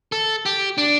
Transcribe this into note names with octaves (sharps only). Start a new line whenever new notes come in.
A4
G4
D4